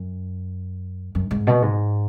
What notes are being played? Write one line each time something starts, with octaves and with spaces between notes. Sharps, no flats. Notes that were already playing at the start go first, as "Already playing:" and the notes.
Already playing: F#2
F#2
G#2
B2
G#2